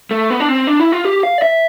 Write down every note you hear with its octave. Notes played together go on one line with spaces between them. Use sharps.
A3
B3
D4
C4
D4
E4
F4
G4
F5
D5
E5